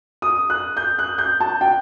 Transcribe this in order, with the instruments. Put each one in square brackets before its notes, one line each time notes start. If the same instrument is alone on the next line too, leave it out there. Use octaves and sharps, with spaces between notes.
[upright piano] D#6
F#6
G6
F#6
G6
A5
G5